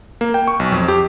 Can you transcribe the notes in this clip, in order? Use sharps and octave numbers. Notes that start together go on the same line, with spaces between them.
A#3
G5
C#6
B1
F2
G4